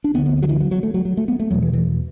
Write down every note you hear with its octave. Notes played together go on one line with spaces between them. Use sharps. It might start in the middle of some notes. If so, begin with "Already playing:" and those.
D4
D2 D3 B3
B3
B3
F#3
E3
F#3
F#3
A3
F#3
F#3
A3
B3
A3
E2 B2 F#3
E3
E3